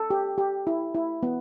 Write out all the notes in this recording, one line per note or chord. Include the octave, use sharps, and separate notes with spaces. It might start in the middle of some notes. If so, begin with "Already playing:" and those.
Already playing: A4
G4
G4
E4
E4
B3